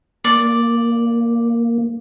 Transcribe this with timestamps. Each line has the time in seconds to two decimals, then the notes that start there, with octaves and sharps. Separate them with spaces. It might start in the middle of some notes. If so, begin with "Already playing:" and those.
0.24 A#3 D5